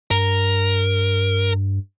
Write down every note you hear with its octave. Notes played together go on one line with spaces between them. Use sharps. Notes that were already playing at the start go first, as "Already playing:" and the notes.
G2 A#4